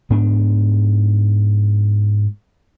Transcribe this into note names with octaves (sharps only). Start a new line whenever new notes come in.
G#2 B3 D4